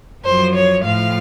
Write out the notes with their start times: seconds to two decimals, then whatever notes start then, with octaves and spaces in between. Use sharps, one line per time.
0.25 F#2 F3 C5
0.54 C#5
0.84 A2 F3 F5